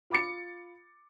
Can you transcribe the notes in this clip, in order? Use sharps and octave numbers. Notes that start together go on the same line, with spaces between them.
F4 B5 D6 A6 C#7